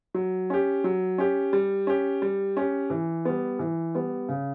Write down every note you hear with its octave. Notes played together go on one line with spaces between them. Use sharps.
F#3
C#4 G4
F#3
C#4 G4
G3
C#4 G4
G3
C#4 G4
E3
G3 B3
E3
G3 B3
C#3